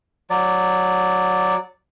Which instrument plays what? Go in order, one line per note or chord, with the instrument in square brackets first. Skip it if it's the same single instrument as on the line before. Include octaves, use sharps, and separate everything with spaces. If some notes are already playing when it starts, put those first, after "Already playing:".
[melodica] F#3 D5